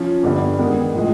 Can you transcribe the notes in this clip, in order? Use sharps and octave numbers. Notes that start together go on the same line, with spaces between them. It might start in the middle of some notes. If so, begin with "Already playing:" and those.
Already playing: F3 C#4
G2 D3 G3 B3
D#3 G#3 B3 D#4
A2 F3 G#3